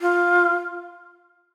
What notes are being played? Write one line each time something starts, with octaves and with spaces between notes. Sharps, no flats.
F4